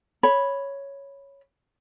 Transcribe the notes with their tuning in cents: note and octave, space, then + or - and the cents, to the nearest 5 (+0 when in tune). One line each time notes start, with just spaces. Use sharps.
C#5 +0 B5 -5